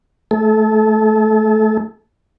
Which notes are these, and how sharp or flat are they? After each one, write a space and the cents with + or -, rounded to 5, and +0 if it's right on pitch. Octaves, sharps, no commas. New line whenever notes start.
A3 -15 A4 -30